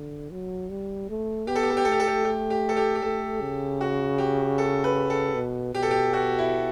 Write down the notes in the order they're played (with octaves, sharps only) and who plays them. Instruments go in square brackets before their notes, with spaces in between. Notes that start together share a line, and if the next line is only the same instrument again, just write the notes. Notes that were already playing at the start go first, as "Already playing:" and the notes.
Already playing: [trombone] D3
F#3
G3
A3
[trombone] B3 [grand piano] G4
[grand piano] A4
G4
A4
G4
[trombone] A3 [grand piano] A4
[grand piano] G4
A4
G4
G4
G4
A4
G4
G4
[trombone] A3 [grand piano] A4
[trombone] C#3
[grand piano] F#4
G4
A4
B4
A4
[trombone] B2
[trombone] B2 [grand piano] G4
[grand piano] A4
G4
F#4
E4